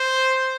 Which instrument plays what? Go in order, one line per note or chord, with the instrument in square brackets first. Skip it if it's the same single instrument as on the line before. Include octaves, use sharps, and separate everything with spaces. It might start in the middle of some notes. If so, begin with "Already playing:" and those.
Already playing: [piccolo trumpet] C5